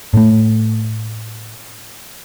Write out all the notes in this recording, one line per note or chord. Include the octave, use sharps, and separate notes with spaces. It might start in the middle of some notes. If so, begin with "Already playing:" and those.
A2 A3